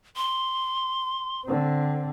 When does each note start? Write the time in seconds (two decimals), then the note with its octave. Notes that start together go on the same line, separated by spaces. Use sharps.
0.17 C6
1.46 D3 C4